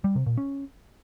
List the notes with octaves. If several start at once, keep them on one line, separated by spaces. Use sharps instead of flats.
G3
C3
A#2
C#4